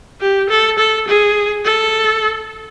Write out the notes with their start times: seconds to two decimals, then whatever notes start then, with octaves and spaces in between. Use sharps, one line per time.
0.21 G4
0.49 A4
0.78 A4
1.07 G#4
1.64 A4